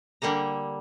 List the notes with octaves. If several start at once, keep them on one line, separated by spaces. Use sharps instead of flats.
D3 G3 A#3 A4 A#5